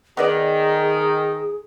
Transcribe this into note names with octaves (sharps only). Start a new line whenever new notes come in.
D#3 B3 G#4 A#4 D5